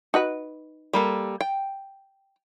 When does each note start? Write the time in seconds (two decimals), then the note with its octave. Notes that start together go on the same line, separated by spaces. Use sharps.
0.14 D#4 F#4 B4
0.93 G3 A#3 A4
1.41 G5